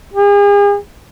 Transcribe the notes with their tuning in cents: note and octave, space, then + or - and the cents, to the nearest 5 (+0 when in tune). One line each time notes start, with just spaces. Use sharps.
G#4 -40